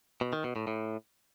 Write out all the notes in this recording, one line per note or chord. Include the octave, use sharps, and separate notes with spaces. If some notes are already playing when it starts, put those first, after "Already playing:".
B2
D#3
B2
A2
A2